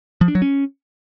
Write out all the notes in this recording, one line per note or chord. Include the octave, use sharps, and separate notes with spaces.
F3
D4
F#3
C#4